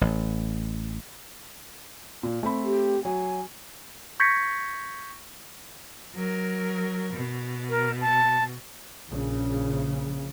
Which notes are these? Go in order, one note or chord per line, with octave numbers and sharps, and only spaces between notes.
A1
A#2
A3 C4 B5
G4
F#3 G#5
C#6 G6 G#6 A#6 B6 C#7
F#3 A#4
B2
A#4
A5
A#1 C#3